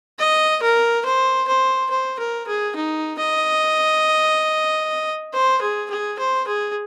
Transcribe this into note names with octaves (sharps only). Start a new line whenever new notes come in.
D#5
A#4
C5
C5
C5
A#4
G#4
D#4
D#5
C5
G#4
G#4
C5
G#4